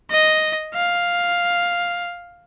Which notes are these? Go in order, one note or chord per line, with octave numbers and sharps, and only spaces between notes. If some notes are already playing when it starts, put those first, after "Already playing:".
D#5
F5